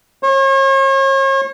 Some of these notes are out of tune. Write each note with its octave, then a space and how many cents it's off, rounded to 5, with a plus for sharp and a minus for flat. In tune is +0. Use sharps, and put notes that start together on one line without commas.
C#5 -40